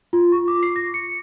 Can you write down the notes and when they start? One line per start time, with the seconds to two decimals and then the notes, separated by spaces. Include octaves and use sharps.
0.13 F4
0.32 C#6
0.48 D6
0.63 C7
0.76 A#6
0.94 C#7